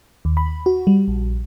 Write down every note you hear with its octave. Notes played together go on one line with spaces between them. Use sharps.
D#2
B5
F#4
G3
A#1